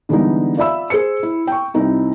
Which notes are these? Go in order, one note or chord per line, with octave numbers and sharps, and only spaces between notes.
D3 E3 G3 G#3 B3 D#4
F4 D5 E5 B5 E6
G#4 C5 C#7
E4
G5 C#6
C2 C4 D#4 E4